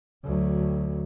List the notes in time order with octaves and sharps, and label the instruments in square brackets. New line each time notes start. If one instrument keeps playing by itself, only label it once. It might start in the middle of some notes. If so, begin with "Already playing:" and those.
[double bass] D2 F#3